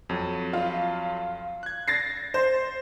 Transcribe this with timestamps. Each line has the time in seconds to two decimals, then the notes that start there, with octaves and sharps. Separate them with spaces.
0.09 F2 F#3
0.53 F4
1.63 F#6 G#6
1.88 A6 A#6 C7
2.34 C5